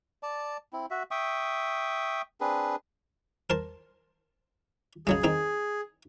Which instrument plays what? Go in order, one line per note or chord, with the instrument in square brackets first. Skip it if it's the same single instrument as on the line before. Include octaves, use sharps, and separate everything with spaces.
[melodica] D5 A5
C4 E4
F#4 E5
E5 G5 C#6 D#6
C4 D4 G#4 B4
[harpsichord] A#4 C5 A5
[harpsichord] C#3 F#3 G#3 [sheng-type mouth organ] G#4
[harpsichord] D#3 C4 D#4